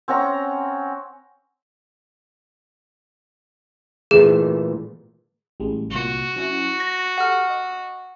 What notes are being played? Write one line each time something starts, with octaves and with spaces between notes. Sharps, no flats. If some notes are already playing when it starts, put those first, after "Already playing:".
C4 C#4 F#5 A#5
A#2 E3 A3 G#4
A1 G3 G#3
C2 A#2 F#4
F#3 C#4 E4
G6 A#6
G4 A4 F#5 F6
D#5